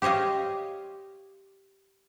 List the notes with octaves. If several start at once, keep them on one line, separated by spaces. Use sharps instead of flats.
G4 C5 C#5 D#5 F5